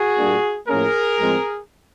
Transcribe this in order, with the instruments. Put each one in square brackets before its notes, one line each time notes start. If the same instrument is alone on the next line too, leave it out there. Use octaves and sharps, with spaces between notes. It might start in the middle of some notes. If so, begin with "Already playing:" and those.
Already playing: [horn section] F#4 G#4
A#2 G3 A#3 D4
A2 F3 A#3 C#4 G#4 A#4
A2 F3 G#3 C4